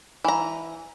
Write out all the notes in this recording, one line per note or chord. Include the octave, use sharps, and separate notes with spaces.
E3 A#5